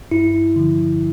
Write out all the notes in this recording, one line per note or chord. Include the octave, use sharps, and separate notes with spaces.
G2 E4
D3 F3